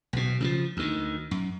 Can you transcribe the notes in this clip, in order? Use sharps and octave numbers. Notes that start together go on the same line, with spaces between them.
B1 B2
C#3 E3 F3
D2 D#3
F#2